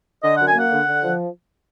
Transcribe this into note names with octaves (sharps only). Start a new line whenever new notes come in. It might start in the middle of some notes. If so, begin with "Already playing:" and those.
D3 D#5
F#2 F#5
G#5
A#3 F#5
D3
D3
F3